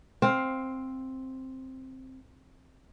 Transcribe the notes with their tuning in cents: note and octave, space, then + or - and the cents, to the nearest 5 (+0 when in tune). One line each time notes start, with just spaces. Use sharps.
C4 +5 F5 +15